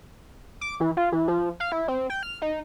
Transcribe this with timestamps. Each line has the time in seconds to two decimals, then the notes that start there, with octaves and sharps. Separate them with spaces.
0.61 D6
0.80 E3
0.97 F4
1.12 E3
1.28 F3
1.60 F5
1.72 E4
1.88 C4
2.10 G5
2.23 F6
2.42 D#4